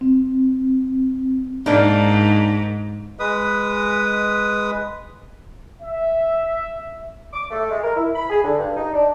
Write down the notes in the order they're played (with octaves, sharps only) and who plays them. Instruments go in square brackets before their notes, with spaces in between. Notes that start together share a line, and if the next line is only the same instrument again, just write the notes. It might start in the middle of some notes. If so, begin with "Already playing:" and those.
[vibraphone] C4
[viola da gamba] G#2 [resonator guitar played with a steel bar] A#3 D4 D#4
[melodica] G#3 B4 D#6
[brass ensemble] E5
[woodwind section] D6
A3
G#3
A#4
E4
B5
G#4
D3
G2
D#4
D4